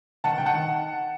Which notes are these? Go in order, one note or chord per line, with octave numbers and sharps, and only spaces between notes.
D#3 F#5 A5
D#3 G5
F#5 A5